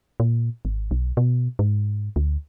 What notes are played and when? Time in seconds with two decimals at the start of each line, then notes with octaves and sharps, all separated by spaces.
0.20 A#2
0.65 G#1
0.91 B1
1.17 B2
1.59 G#2
2.16 D2